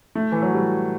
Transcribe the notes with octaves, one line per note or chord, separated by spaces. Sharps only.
A3
E3
F#3
G3